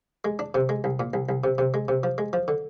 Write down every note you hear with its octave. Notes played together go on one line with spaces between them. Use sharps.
G#3
D4
C3
G#3
C2
A#2
C2
C2
C3
C3
G#3
C3
F3
G#3
F3
D3